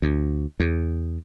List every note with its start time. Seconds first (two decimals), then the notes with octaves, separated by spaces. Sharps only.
0.02 D2
0.60 E2